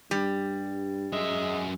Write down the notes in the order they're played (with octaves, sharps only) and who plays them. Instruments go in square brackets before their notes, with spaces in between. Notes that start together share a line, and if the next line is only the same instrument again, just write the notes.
[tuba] G2 [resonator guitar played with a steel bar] G3
[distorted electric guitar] F#2 E5 [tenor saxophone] G#3